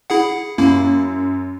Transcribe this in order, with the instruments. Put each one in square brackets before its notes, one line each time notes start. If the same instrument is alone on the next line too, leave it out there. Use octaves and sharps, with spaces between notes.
[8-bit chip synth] E4 G#4 F#5
[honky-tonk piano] F#2 [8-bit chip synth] A#3 E4